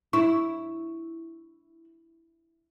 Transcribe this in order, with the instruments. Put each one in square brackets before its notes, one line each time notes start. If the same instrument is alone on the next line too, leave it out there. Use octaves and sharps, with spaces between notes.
[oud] E4 [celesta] C#6